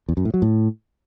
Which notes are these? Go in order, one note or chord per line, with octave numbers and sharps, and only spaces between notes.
E2
F#2
A2
F#3
A2